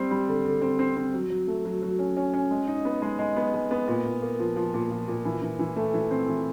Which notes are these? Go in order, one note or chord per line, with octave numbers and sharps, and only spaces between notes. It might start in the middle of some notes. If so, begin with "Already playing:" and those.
Already playing: G3 C4
G3
D3
D3
C4
C4
C4
F#3
F#3
A3
F#3
F#3
C#4
C#4
C#4
G#3
D#4
B3
G#3
G#3
B3
G#3
B3
A#2
A#2
A#3
F3
F3
A#2
F3
A#2
E3
E3
E3
A3
E3
C4
E3